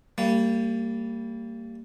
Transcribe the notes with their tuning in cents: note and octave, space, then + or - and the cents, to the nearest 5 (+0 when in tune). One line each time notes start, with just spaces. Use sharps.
G3 +0 A#3 -30